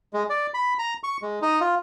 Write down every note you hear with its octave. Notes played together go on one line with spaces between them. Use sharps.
G#3
D5
B5
A#5
C#6
G#3
D#4
F4